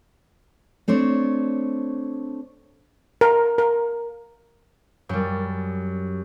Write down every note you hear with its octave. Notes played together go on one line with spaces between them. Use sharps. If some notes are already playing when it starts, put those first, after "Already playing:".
A3 C4 D4 C#5
A#4
A#4
F#2 G3